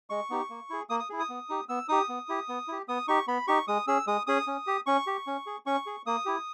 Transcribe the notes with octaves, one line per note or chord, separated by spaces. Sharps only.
G#3 C#6
B3 D#4 G4
A#3
E4 G#4
A#3 D#6
D#6
E4 G#4
D#6
B3
D#4 G4
B3 E6
D#4 G4 D#6
B3
E4 G4
B3
E4 G4
B3 D#6
D#4 G4 C#6
B3 B5
D#4 G4 C#6
G#3 D#6
C#4 G#4 E6
G#3 D#6
C#4 G#4 D#6
C#4
G4
C#4 C#6
G4
C#4
G#4
C#4 C#6
G#4
A#3 D#6
E4 G4